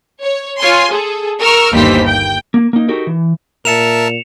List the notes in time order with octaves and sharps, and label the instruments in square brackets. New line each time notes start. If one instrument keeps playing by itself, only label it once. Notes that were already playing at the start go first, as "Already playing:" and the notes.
[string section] C#5
F4 C#5 G#5 C6
G#4 A4
A#4 C#6 E6 F6
G1 D#2 E3 G4 C5 B6
G5
[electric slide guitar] A#3
A#3 D#4
D#4 F#4 G4 A4 A#4
E3
[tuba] A#2 [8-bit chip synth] A#4 E5 A5 [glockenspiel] C#7 E7 F7